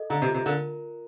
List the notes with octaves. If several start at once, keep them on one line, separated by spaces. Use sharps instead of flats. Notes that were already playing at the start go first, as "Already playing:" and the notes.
Already playing: A4 D#5
D3 A#5
C3
F4
C3
D3 A#4